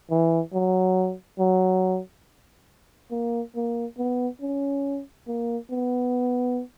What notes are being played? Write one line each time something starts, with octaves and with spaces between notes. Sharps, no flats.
E3
F#3
F#3
A#3
A#3
B3
C#4
A#3
B3